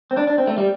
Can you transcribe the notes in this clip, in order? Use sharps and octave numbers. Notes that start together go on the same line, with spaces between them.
C4
D4
D4
C4
A3
G3